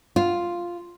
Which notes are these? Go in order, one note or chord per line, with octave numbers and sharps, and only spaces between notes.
F4